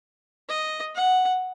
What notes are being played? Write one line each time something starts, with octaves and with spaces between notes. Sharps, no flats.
D#5
F#5